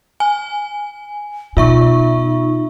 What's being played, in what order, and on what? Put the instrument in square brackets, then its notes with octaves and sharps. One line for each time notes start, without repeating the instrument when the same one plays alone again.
[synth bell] G#5
[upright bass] B2 [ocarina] D#4 [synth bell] F4 E5 C#6